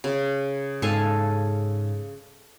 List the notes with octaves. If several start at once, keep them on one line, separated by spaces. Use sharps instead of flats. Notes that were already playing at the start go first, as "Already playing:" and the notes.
C#3
G#2 A4 F5 G#5